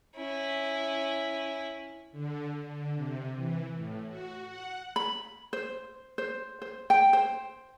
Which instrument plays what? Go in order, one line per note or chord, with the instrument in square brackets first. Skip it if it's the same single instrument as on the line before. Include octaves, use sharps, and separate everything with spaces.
[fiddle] C#4 E4
[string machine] D3
D3
C3
E3
A2
F#4
F#5
[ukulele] B5
C5
C5
C5
G5
C5